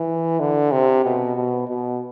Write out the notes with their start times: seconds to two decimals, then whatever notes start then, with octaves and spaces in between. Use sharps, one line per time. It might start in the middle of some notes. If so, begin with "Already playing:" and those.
Already playing: E3
0.40 D3
0.72 C3
1.04 B2
1.36 B2
1.68 B2